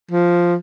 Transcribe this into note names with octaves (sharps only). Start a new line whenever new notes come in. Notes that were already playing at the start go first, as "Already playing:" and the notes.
F3